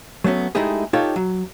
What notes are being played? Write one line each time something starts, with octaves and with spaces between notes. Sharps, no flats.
F#3 A3 B3 C#4
G#3 A3 D#4 E4 G4 G#4
D#4 F4 G4 A4 C#5
F#3